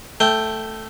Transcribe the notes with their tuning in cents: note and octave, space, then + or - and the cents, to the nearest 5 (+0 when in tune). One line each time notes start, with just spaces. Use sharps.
A3 +0 G5 +0